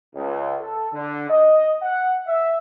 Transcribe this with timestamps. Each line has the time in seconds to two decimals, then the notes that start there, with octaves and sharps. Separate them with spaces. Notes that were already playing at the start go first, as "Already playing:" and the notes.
0.15 C#2
0.60 A4
0.93 D3
1.29 D#5
1.83 F#5
2.27 E5